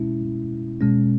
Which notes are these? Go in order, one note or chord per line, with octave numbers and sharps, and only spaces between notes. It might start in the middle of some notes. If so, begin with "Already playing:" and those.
Already playing: B2 G#3 C#4 E4
B2 G#3 C#4